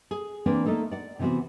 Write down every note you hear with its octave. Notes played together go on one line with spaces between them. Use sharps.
G#4
E3 A#3 C4 D4 B4 D5
A3 A#3 D#4 A4
D5 F#5
C3 E3 B3 C4 F#4